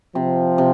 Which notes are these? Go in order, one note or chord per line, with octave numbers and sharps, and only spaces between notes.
C3 F3
C3